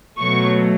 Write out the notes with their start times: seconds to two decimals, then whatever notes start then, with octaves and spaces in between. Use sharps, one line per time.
0.19 B2 F#3 A3 C#6